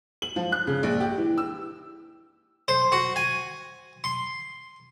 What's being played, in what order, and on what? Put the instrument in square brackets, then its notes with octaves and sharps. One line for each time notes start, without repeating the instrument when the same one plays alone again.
[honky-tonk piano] F#7
F3
F#6
C#3
A#1
G4
E3
E6
[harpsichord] C5
F#4
G#5
C6